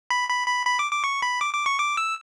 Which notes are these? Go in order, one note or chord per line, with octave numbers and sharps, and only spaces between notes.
B5
B5
B5
B5
D6
D6
C#6
B5
D6
D6
C#6
D6
E6